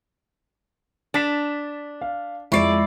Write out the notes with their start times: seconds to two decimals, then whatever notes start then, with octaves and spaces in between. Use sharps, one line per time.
1.14 D4 A6 B6 E7
2.01 F5
2.52 F2 G#3 E4 D5 C#6 C7